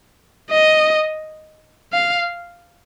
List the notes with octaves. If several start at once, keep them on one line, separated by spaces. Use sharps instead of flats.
D#5
F5